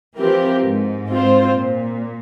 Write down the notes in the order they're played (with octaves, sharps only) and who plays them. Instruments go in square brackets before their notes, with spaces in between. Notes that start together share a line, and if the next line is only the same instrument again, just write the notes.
[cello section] E3 [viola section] F3 C4 G4 A#4
[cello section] G#2
[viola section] C4 F4 C5
[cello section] A#2